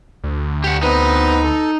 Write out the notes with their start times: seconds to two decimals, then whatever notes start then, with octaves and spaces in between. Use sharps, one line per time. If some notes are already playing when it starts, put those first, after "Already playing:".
0.24 D2
0.64 G4 F#5
0.83 B3 C4 D#4 B4 D#5
1.43 A4